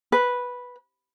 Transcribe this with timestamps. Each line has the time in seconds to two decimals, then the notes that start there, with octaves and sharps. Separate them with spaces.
0.12 B4